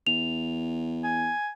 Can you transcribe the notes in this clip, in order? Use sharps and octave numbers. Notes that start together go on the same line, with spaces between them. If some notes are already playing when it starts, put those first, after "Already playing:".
E2 F7
G#5